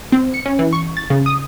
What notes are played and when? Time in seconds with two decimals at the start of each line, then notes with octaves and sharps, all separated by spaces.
0.12 C4
0.34 C#7
0.46 C#4
0.59 E3
0.73 C#6
0.97 A6
1.10 C#3
1.26 D#6